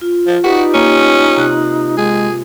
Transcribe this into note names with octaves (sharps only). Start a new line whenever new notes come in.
F4
F3
D#4 F#4 G4 B4 D5
A#3 C#4
C3 F#6
G#3 G#4